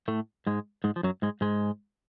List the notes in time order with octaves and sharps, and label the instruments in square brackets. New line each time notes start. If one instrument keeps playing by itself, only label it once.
[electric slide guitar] A2 A3
G#2 G#3
G#2 G#3
F3
F#2 F#3
G#2 G#3
G#2 G#3